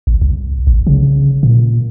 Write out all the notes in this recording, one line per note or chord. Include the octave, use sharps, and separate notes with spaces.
A1
C2
A1
C#3
A#2